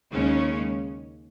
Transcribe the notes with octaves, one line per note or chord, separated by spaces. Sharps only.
D#2 C#3 G#3 C#4